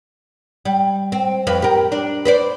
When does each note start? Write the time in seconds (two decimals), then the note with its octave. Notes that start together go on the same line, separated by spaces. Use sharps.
0.65 G3
1.12 C4
1.47 F2 B4
1.62 G4 A#4
1.92 D4
2.25 B4 C5 D5